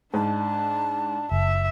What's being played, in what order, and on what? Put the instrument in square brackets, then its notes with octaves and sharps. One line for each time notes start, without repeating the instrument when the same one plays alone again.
[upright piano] G#2 [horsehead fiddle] D4 [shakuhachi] A5
[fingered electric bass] F#1 [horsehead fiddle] E5